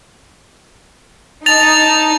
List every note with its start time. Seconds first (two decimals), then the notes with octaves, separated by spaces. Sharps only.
1.46 D#4 A5 A6 F7